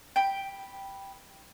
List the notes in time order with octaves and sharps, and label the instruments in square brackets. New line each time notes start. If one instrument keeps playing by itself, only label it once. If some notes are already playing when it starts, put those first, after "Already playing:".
[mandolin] G5 B5